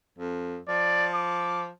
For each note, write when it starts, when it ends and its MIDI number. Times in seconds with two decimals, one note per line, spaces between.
0.18 0.58 41
0.68 1.68 53
0.68 1.09 74
1.15 1.66 86